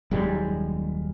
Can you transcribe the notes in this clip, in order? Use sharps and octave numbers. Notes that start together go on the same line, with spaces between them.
D#1 F#2 G3 G#3